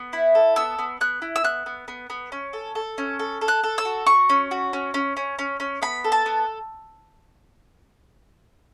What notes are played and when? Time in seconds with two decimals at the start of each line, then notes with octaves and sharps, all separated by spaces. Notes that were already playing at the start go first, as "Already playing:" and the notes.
Already playing: B3
0.13 E4
0.35 A4
0.56 B3 E6
0.79 B3
1.01 B3 F#6
1.22 E4
1.36 E6
1.44 B3 F#6
1.66 B3
1.88 B3
2.10 B3
2.32 C#4
2.53 A4
2.75 A4
2.98 C#4
3.19 A4
3.41 A4
3.48 F#6
3.63 A4
3.78 E6
3.85 F#4
4.06 F#4 C#6
4.30 C#4
4.51 F#4
4.73 C#4
4.94 C#4
5.17 C#4
5.39 C#4
5.60 C#4
5.82 B3 B5
6.04 A4
6.12 A5
6.26 B3